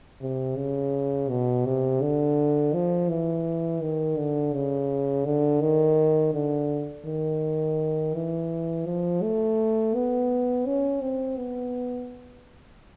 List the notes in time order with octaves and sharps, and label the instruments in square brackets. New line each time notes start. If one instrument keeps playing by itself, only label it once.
[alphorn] C3
C#3
B2
C3
D3
F3
E3
D#3
D3
C#3
D3
D#3
D3
D#3
E3
F3
A3
B3
C#4
C4
B3